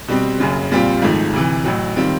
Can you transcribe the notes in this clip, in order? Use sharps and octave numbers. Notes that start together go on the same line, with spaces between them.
B2 G3 C4
F#1 F#2 C#3
A#2 G3 C4 F4
G#1 G#2 F3 A3
D2 C3 E3
A1 A2 F#3
D#3 G3 C4 F4